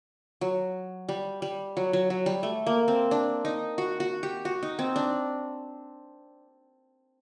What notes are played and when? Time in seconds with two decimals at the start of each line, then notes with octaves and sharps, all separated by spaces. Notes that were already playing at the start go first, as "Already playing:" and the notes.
0.41 F#3
1.09 G3
1.42 G3
1.77 F#3
1.93 F#3
2.10 F#3
2.26 G3
2.43 A3
2.67 A#3
2.88 C4
3.11 D4
3.45 D#4
3.78 F#4
4.00 F#4
4.23 G4
4.45 F#4
4.63 D#4
4.79 C4
4.96 D4